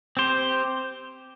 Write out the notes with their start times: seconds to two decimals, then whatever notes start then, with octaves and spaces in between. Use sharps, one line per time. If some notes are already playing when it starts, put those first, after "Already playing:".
0.17 C4 G4 C5